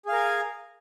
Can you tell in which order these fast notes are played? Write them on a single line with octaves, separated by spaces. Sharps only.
G#4 F5 A#4 G#5